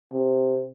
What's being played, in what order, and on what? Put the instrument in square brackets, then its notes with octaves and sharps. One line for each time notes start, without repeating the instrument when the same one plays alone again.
[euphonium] C3